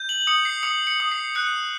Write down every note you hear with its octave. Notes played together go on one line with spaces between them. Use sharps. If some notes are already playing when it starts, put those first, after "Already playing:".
Already playing: G6
F#7
D#6 C#7
C7
D#6 C#7
C#7
D#6
C7
F#6 C#7